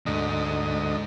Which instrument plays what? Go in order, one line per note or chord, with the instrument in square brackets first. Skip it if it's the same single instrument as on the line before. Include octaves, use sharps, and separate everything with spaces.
[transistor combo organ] D2 D#5 [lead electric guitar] G#2